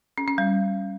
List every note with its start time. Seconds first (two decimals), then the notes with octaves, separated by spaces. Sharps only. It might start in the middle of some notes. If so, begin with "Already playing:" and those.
0.18 C#4
0.28 C#4
0.38 G3